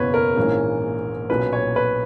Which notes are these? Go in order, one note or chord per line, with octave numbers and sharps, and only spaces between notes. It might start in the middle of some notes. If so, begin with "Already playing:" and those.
Already playing: F#1 E2 B2 B4 C#5
A#4
A#1 G#2 E3 A#3 C#4
B1 A#2 F#3 C#4 B4
C#5
B4